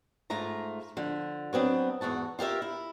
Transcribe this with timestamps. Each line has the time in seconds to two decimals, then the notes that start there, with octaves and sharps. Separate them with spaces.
0.30 G#2 A3 F4 A#5
0.97 D3 F3
1.53 F#3 B3 C4 D4
2.01 E2 G#2 F#4 A5
2.39 F4 G4 A#4 E5
2.62 E4